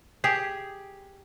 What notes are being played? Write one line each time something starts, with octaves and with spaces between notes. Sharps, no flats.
G4 G#4